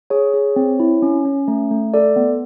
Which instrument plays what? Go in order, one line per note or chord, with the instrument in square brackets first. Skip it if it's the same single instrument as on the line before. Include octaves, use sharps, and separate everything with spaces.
[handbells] G#4 C#5
G#4
C4
E4
C#4
C#4
A3
A3
A4 D5
B3